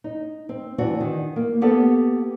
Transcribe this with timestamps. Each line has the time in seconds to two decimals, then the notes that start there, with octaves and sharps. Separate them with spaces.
0.04 D#4
0.49 C4
0.78 E3 C4 D4 F#4
1.01 D#3
1.36 A#3
1.61 A#3 B3 G4 A4 B4